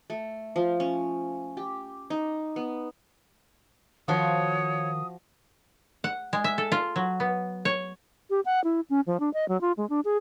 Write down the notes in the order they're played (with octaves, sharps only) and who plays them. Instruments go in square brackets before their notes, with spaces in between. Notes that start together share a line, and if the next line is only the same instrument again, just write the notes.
[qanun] A3
F3
C#4
G4
D#4
B3
[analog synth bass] D#3 [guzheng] F3 F#4 [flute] C#5 [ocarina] D#6
[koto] F#5
G#3
E5
A4
F4
F#3
B3
C#5
[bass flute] G4
F#5
E4
C#4
F3
D4
D#5
F#3
F4
G#3
D4
G#4